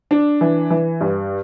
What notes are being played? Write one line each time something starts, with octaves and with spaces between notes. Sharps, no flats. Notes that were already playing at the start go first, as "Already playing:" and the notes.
D4
E3
E3
G2